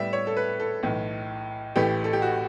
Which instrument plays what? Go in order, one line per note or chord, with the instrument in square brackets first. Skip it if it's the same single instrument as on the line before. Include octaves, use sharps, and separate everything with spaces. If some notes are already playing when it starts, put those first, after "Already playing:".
Already playing: [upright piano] A2 G3 B3 E5
C#5
A4
B4
A4
B1 A2 E3
A1 A2 E3 A3 G4
A4
G4
F#4